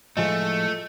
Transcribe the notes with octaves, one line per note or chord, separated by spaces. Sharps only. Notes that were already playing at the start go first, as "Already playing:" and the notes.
A2 F3 G#3 A3 D#5 G#5